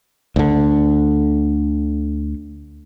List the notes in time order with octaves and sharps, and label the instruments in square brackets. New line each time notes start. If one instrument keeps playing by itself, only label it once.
[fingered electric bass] D2 D3